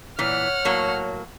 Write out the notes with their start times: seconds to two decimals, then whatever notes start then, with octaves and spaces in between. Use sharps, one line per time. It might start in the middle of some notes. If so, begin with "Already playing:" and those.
0.19 A#2 E3 C#5 F#5 F6
0.65 A2 F#3 A#3